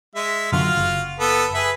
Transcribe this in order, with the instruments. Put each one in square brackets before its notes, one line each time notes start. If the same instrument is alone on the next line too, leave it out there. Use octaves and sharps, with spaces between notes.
[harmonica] G#3 E5
[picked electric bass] F#2 D3 [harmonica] F4 F#4 F5
[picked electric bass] F#1
[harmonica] B3 A4
G#4 B4 E5